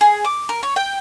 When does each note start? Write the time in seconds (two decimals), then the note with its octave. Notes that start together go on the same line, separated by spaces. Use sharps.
0.01 G#4
0.24 D6
0.49 A#4
0.63 C#5
0.76 G5